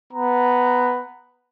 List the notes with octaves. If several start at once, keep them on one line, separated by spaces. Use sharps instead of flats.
B3 A#5